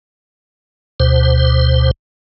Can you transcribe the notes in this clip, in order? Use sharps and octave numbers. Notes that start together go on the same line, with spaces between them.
D2 B2 C5